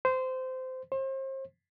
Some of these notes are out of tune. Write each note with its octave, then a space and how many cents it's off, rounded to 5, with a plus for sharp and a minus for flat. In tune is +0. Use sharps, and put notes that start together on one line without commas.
C5 -20
C5 +35